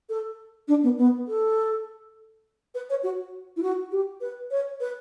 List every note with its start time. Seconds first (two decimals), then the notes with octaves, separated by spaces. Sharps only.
0.09 A4
0.68 D4
0.83 B3
0.98 B3
1.28 A4
2.75 B4
2.90 C#5
3.03 F#4
3.56 E4
3.62 F#4
3.92 G4
4.21 B4
4.51 C#5
4.80 B4